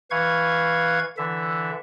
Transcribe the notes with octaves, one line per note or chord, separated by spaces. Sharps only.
E3 B4 F5 C#6 G#6
D3 E3 E5